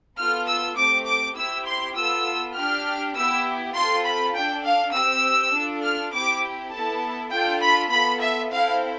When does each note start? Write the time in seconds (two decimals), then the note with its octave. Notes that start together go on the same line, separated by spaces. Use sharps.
0.17 B3 F4 A4 F6
0.47 E6
0.76 A3 C4 G4 D6
1.07 D6
1.36 C4 E4 G4 E6
1.66 C6
1.96 B3 F4 A4 E6
2.55 D4 G4 F6
3.15 B3 E4 G4 E6
3.74 C4 F4 A4 C6
4.04 B5
4.34 D4 A4 G5
4.64 F5
4.94 C4 G4 E6
5.53 D4 F4 A4
5.83 F6
6.13 C4 E4 G4 D6
6.72 B3 E4 A4 A5
7.32 D4 F4 A4 G5
7.62 B5
7.92 B3 F4 A4 B5
8.22 E5
8.52 C4 E4 A4 F5